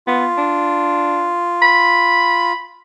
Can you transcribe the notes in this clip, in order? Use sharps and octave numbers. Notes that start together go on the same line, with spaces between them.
B3 F4
D4
B5